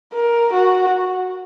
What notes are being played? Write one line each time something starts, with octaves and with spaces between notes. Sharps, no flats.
A#4
F#4